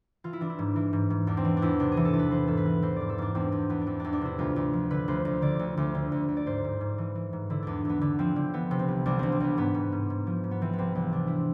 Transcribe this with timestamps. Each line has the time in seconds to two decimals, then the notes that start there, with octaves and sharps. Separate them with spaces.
0.24 E3 F4
0.33 E4
0.41 E3 D4
0.50 E4
0.59 G#2
0.76 E3
0.93 G#2
1.10 G#2
1.27 E2 D4
1.37 C4
1.45 E3 D4
1.57 D4
1.62 E2 E4
1.80 C3 D4
1.92 G#4
1.97 E3
2.05 A4
2.14 E2
2.19 B4
2.31 E3 C5
2.47 G#2 A4
2.57 B4
2.65 E3
2.82 E3 C5
2.96 G#2 D5
3.09 A4
3.18 G#2 D4
3.35 E2 C4
3.52 E2 C4
3.70 E2 B3
3.81 D4
3.87 E2 C4
4.00 E2 D4
4.13 D4
4.21 C3 E4
4.39 D2 F4
4.56 D2
4.73 F3
4.91 D3 B4
5.08 D2 C5
5.25 D2
5.42 D3 D5
5.59 D2
5.77 D2
5.95 D3
6.12 D2
6.28 D2
6.37 D5
6.46 G#2 C5
6.64 G#2
6.81 G#2
6.98 E3
7.15 E3
7.33 G#2
7.50 D3 E4
7.63 E2 D4
7.85 E2 B3
8.01 D3 B3
8.19 F3 C4
8.36 D3
8.54 E3 B3
8.71 C3
8.79 C4
8.88 C2
9.06 C2 D4
9.19 C2 C4
9.32 C4
9.40 C2 B3
9.57 G#2 B3
9.74 G#2
9.92 G#2
10.10 G#2
10.27 F3
10.44 G#2
10.51 B3
10.62 E3 C4
10.73 B3
10.78 C2 C4
10.95 C2 C4
11.13 C3 D4
11.27 E4